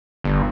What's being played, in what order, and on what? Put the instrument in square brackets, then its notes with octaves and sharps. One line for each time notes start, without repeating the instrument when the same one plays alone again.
[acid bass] G1